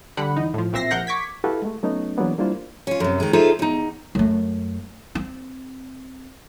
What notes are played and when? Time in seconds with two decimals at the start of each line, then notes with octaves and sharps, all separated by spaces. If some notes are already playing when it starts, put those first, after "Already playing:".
0.17 D3 G3 F#5 B5
0.36 E2 D#4
0.54 A2 F3
0.73 B1 A#2 C4 E5 A#6 C7
0.91 A#1 F3 A#4 F#5 G6 A#6
1.07 C#6 D6 G#6 B6
1.44 E4 F#4 G4 A4 B4 F5
1.62 G#3 A3
1.83 F#3 A3 B3 C#4 D#4
2.17 E3 F#3 G#3 A#3 B3 D4
2.38 G3 A#3 D4 E4 F4 C5
2.87 C#4 F4
3.00 F#2 C3
3.20 D#3 G#3
3.33 D#4 F4 G#4 A4 C5 E5
3.59 E2 D#4
4.15 F#2 A3
5.15 C4